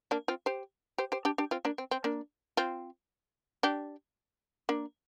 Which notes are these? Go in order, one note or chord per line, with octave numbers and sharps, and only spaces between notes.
A#3 D4
C4 F4
G4 C5
G4 C5
G4 C5
D4 G4
D4 G4
C4 F4
A#3 D4
C4
C4
A#3 D4
C4 F4
D4 G4
A#3 D4